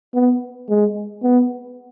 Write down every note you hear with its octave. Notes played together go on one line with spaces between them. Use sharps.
B3
G#3
B3